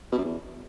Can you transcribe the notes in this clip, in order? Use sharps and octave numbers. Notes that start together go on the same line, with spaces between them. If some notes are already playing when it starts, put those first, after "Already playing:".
B2
F#2
E2